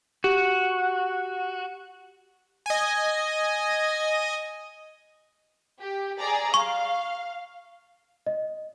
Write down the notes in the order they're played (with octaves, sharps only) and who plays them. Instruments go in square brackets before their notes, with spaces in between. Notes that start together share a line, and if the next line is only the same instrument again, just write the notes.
[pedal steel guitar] F#4 [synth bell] G4
[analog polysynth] D#5 G#5
[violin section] G4
G#4 D5 A#5
[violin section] F5 [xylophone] C#6
[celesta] D#5